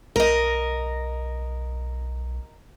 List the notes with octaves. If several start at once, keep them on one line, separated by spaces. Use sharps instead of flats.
B1 A#4 D#5